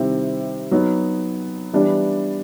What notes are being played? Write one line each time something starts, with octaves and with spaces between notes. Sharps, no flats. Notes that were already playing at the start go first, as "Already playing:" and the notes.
Already playing: C3 D#3 G3 C4 E4
F#3 B3 D#4
E3 G3 B3 D4